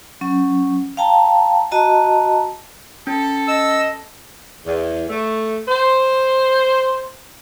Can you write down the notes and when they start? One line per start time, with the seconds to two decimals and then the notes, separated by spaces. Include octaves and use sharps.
0.21 F#3 C#4
0.97 F5 G5 A5 A#5
1.71 F#4 D#5 A5 A#5
3.07 C#4 A4
3.48 D#5 E6
4.65 E2
5.09 A3
5.68 C5